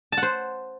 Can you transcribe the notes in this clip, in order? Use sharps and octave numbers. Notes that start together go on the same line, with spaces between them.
A5
F#5
C5